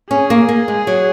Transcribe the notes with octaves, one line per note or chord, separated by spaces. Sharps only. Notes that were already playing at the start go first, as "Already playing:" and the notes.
C#4 G#4
A#3
A#3
G#3
F#3